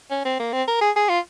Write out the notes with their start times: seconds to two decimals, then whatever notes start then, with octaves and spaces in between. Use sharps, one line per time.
0.11 C#4
0.25 C4
0.40 A#3
0.53 C4
0.68 A#4
0.81 G#4
0.96 G#4
1.09 F4